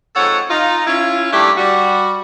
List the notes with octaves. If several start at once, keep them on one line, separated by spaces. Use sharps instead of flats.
F2 G#2 A4 C#5 F#5
D#4 F4
C#4 E4 F4
G3 A3 A#3 D4 E4 G4
G3 F#4